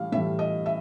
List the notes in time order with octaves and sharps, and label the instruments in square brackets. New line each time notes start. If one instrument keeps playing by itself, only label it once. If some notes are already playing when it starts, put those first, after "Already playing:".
Already playing: [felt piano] A2 E3 G3 F5
A2 E3 G3 E5
D#5
E5